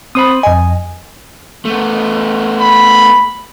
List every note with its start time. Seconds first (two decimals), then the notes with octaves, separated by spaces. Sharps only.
0.15 C4 C5 B5 D#6
0.43 F2 D#5 G#5
1.65 A3 B3
2.60 B5